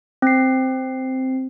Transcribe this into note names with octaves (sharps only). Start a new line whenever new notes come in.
C4 C7